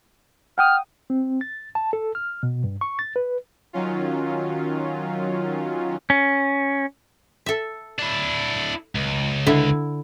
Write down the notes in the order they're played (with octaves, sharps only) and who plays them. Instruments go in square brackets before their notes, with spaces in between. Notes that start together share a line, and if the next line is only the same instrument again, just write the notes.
[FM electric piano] F#5 G5 D#6 [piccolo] F6
[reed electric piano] C4
A6
A5
A4
F6
B2
G2
C#6
A6
B4
[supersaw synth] D#3 F#3 C#4 F4
[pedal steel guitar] C#4
[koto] A4 E5
[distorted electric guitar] D4 E4
C#2
[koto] D3 E4 E5